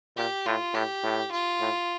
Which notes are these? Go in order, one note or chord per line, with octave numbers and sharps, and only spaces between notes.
A#2 G4
A2 F4
A2 G4
A2
F4
A2